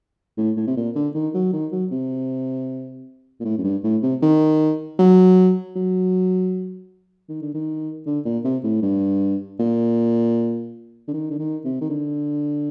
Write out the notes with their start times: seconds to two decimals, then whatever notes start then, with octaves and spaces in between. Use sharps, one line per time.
0.38 A2
0.57 A2
0.67 C3
0.77 A#2
0.96 D3
1.15 D#3
1.34 F#3
1.53 D#3
1.72 F#3
1.91 C3
3.40 A#2
3.45 A2
3.58 F#2
3.64 G2
3.84 A2
4.03 C3
4.22 D#3
4.99 F#3
5.76 F#3
7.29 D#3
7.42 D3
7.54 D#3
8.06 D3
8.25 A#2
8.45 C3
8.64 A2
8.83 G2
9.60 A#2
11.08 D3
11.14 D#3
11.31 D3
11.39 D#3
11.65 C3
11.81 D#3
11.90 D3